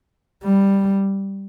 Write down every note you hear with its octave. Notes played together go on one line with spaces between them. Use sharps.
G3